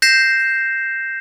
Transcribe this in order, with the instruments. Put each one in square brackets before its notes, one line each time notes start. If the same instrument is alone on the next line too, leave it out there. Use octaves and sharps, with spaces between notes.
[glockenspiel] G6 A#6 C7 E7